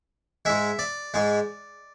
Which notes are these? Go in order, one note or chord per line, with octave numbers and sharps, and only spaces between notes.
G#2 G#3 E5
D5
G#2 G#3